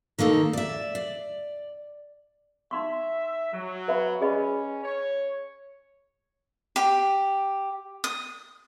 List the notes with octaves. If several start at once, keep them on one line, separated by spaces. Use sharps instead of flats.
D#3 A#3 D#4 A4
D5 E5
D5
D#4 E5 C6 C#6
F#3
B4 E5 B5
C#4 G#4 D#5 B5
C#5
G4
D#6